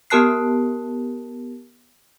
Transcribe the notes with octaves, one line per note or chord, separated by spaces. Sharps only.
B3 G4 A#4 A5 F#6 C7